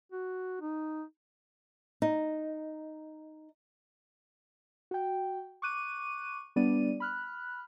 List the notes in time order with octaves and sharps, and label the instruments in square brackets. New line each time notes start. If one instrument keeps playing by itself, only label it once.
[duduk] F#4
D#4
[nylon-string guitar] D#4
[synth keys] F#4 G5
C#6 D6 F#6 D#7
G3 B3 D4 D5 D#7
B5 F6 F#6